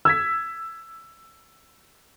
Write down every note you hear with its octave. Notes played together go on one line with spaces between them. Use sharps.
E6 G#6 B6